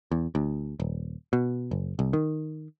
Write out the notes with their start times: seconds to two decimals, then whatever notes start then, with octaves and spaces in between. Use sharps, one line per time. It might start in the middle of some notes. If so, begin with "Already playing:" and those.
0.12 E2
0.35 D2
0.80 D#1
1.33 B2
1.71 F#1
1.99 C2
2.13 D#3